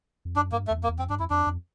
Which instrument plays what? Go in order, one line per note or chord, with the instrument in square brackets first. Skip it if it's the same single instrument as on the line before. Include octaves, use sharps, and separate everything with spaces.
[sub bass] F2
[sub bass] F#2 [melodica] D4
[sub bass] G2 [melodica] A#3
[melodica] A3
[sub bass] E2
F2
[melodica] A#3
[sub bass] E2
[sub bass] F2 [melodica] C4
[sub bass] G2 [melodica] D4
[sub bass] F2 [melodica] E4
[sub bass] F2 [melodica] D4
[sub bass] F2